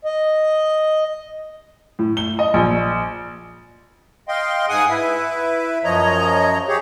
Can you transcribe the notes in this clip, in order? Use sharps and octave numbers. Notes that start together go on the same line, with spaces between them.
D#5
A2
G7
D#5
A#1
D#5 F5 G5 C6
G#2 G#4 F#5 G#5 D#6
E4 B4 E5
F#2 F3 C#5 D#5 A#5
G4 G#4 C#5